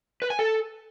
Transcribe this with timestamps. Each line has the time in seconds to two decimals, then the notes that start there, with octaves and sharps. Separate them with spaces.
0.22 B4
0.30 G#5
0.39 A4